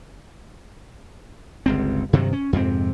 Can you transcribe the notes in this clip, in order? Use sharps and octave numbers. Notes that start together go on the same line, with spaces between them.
G1 C#2 C4
G2 C3 D#3 F#3
C#4
F2 G#2 C3 C4